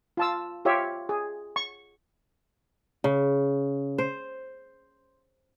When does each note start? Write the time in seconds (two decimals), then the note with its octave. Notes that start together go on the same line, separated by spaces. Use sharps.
0.17 F4 A5 E6
0.65 F4 G4 C#5 E5
1.09 G#4
1.56 C#6
3.04 C#3
3.98 C5